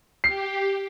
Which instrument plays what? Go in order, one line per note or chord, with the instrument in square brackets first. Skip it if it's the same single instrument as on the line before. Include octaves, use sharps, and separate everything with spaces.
[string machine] G4 [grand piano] C7